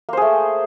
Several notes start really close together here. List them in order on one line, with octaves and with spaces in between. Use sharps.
A#3 C5 G#4 A3